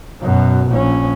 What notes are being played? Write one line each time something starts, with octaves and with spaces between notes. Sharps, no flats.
F#2 B2
A#1 C#4